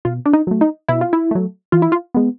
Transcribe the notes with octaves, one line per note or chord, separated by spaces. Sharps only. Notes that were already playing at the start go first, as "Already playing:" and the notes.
B2 F4
D4
D#4
F#3 A3
D#4
B2 E4
F4
E4
F#3 A3
E3 F4
E4
F4
G#3 B3